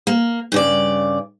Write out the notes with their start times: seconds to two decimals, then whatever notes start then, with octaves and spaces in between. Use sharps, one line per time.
0.07 A#3
0.52 G2 C#3 D5